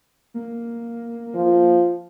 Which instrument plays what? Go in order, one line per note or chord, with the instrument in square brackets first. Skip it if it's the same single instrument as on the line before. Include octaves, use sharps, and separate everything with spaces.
[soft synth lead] A#3
[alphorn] F3